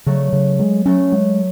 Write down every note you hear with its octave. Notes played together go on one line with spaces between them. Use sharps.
C#3 F#3 A3
C#3
G#3
F#3 A3 C#4
G#3